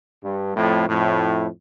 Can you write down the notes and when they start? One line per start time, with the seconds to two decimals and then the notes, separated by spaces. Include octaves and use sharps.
0.23 G2
0.56 F2 A2
0.88 F2 A2